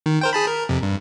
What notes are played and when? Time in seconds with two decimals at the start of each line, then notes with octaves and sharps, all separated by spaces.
0.06 D#3
0.21 A#4 C5 G5
0.33 G#4 A5 B5
0.48 A#4
0.69 F2 C3
0.82 G2